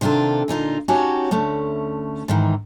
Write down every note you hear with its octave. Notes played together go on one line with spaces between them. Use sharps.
C3 D#3 D4 F4 A4
A#2 D3 D#4 F4
C#4 D#4 F#4 G4 C#5 A5
D2 A3 C#4
G#2 D#3 E3